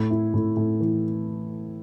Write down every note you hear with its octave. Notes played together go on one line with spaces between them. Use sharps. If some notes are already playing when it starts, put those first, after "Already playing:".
Already playing: A2
E4
A2
A2
E3